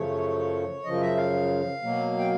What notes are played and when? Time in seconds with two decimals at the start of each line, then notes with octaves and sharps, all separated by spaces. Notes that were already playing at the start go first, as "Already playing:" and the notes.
Already playing: F#2 C#3 F3 A3 C#5
0.84 F#2 C#3 F3 D#5
1.01 E5
1.17 F5
1.82 B2 F#3 A#3
2.18 G5